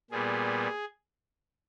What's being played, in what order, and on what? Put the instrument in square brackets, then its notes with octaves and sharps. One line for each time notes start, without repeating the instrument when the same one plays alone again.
[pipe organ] A#2 G3 B3 G#4